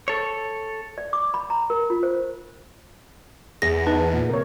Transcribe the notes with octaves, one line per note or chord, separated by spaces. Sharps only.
A4 C#5
D5
D6
B5
A#5
A#4
F4
C5
E2 G#4 A#6
D#4 B4 A5
A#2
C3 A#4 C#5